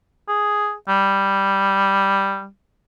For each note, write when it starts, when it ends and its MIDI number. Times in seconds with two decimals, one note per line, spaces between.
0.29 0.73 68
0.89 2.47 55